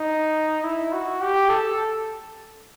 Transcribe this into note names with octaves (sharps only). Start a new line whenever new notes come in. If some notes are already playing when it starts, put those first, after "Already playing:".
Already playing: D#4
E4
F#4
G4
A4